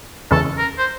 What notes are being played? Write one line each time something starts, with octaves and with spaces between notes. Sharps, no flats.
E2 C#3 E3 G#3 C#4 A4
A#4
C5